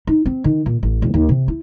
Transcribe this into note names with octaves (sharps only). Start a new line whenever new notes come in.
D#4
C4
D#3
A#2
A1
E1
D#2
C3
E4